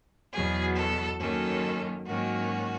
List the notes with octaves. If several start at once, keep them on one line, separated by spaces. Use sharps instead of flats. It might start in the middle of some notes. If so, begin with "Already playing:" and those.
E2 B2 F#3 B3 G#4
A4
F#2 D#3 F#3 A#3 C#4 A4
G#2 D#3 F#3 A#3 C#4 F#4